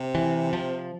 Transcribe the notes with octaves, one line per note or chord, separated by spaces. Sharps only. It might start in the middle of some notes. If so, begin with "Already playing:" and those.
Already playing: C3
E3
F3